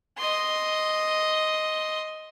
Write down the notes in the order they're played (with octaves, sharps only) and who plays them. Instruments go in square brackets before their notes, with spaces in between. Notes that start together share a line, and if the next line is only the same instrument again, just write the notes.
[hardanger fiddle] D#5 C6